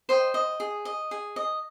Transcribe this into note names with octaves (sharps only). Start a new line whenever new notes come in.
C5 D#5 G5
D#5
G#4
D#5
G#4
D#5